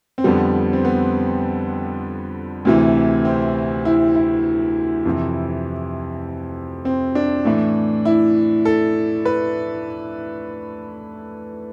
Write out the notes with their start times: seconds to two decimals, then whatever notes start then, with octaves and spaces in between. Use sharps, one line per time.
0.18 C4
0.24 F2 D3 G3 B3
0.73 C4
0.85 B3
2.65 D2 C3 E3
3.25 C4
3.85 E4
4.15 E4
5.06 F2 C3 E3
6.85 C4
7.15 D4
7.45 A2 E3 A3
8.05 E4
8.65 A4
9.25 B4